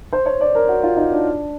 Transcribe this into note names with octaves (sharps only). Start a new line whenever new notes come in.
C5
C#5
D5
A#4
F#4
F4
D#4
D4